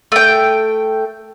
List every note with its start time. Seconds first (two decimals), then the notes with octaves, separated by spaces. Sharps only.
0.12 A3 G5